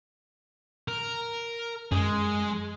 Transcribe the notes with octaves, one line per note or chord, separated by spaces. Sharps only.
A#4
F#2 G#3 G#4